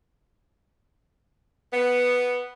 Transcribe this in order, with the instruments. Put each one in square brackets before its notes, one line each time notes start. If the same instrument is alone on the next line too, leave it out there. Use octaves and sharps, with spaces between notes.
[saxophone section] B3